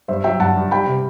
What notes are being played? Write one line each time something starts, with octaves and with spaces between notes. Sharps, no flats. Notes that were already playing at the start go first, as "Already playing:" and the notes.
G2 C5 E5
F#3 E5 G5
G2 F#5 A5
G2
G3 G5 B5
C3